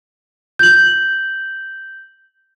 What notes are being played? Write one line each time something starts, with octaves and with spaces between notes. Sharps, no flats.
G6 F#7